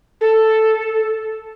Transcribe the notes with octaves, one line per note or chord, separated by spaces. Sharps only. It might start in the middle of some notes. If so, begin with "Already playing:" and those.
A4